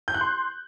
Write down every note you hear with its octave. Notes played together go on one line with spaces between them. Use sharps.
G6
F#6
C6